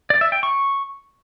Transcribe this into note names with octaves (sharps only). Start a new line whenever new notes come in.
D5
E5
G5
C#6